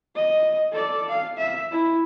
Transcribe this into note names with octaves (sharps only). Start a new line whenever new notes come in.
D#5
A4 D5
F5
E5
E4